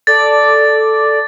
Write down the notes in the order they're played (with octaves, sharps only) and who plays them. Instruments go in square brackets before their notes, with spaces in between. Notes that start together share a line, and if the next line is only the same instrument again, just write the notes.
[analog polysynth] A4 D5 [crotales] A6